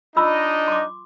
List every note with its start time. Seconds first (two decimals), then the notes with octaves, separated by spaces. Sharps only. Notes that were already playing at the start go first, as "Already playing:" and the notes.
0.16 D4 D#4 F4 D#5 B5 E6
0.68 C6 D6